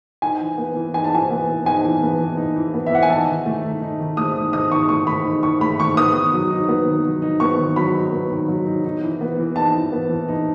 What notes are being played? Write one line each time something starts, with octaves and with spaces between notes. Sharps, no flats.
D#4 G#5
E3
B3
E3
D#4 G#5
A5
E3 G#5
B3
E3
D#4 G#5
E3
B3
E3
D#4
E3
B3
E5
E3 F#5
G#5
D#4 A5
D#3
A3
D#3
D#4
D#3
A3 D#6
D#3
D#4 D#6
D#3 C#6
A3 C#6
D#3 B5
D#4
D#3 C#6
A3 B5
D#3 C#6
B3 D#6
D#3
F#3
D#4
B3
D#3
F#3
D#4
B3 C#6
D#3
F#3 B5
D#4
B3
D#3
F#3
D#4
D#4
E3
B3
E3
D#4 A5
E3
B3
E3
D#4